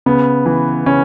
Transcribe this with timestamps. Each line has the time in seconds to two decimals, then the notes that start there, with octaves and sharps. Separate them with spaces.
0.06 C#3 B3
0.46 E3
0.86 C#3 C#4